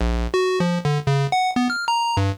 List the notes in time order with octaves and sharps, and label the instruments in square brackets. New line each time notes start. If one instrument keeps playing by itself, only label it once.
[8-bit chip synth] A#1
F#4
F3
D3
C#3
F#5
B3
F6
A#5
G2